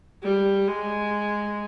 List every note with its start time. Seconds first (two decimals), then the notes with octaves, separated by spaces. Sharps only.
0.23 G3
0.67 G#3